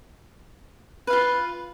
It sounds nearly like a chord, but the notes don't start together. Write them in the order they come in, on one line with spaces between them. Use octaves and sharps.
B4 F5 F4